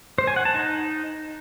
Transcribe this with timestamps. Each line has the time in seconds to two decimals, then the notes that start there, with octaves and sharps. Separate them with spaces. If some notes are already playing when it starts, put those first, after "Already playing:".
0.18 C5
0.27 G#5
0.36 F#5
0.45 A5
0.54 D#4